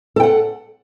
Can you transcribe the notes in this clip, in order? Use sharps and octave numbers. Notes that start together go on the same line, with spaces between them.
A4 F#5 G5